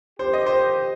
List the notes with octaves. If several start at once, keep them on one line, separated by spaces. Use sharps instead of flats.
F2 D#3 C4 G4 C5
D#5
C5